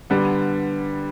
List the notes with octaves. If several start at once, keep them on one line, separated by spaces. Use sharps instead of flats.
D3 G3 B3